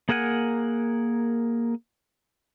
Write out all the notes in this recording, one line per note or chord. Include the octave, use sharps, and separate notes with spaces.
A#3 G#4 A#4 F#5 G#5